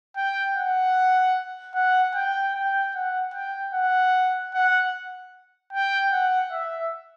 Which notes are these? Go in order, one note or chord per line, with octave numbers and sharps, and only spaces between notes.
G5
F#5
F#5
G5
G5
F#5
G5
F#5
F#5
G5
F#5
E5